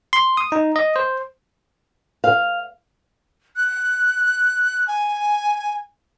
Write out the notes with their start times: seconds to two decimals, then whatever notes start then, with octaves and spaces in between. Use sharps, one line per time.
0.13 C6
0.37 D#6
0.52 D#4
0.76 D#5
0.96 C5
2.24 F5
3.56 F#6
4.88 G#5